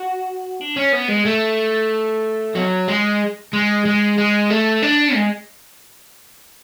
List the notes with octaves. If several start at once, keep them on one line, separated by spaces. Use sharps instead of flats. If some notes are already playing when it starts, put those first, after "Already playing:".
Already playing: F#4
D4
C#4
B3
G#3
A3
F#3
G#3
G#3
G#3
G#3
A3
D4
G#3